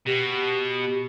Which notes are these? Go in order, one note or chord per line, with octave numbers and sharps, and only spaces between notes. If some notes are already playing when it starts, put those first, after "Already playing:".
B2 G4